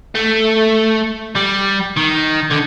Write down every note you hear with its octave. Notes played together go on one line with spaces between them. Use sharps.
A3
G3
D#3
D3